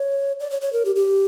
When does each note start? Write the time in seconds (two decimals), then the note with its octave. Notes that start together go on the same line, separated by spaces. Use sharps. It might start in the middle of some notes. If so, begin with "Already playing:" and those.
Already playing: C#5
0.40 D5
0.51 C#5
0.61 C#5
0.73 A#4
0.85 G4
0.96 G4